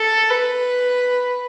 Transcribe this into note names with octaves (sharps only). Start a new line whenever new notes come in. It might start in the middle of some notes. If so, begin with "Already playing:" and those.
Already playing: A4
B4